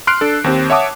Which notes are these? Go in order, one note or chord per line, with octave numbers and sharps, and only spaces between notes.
C6 F6 F#6 C7 D7
D4 A4
D#2 C4 G4
C#5 E5 F#5 A5 D6 D#6